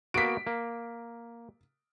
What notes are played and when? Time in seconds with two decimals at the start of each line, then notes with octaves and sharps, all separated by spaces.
0.14 A#3 B3 F#4 B6 D7
0.47 A#3